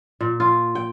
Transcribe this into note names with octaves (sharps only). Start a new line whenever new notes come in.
A#2
F4
G5